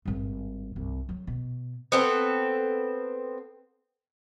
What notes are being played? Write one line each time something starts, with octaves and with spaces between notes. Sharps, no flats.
G#1 G2
C2
F#3
B2
B3 C4 A4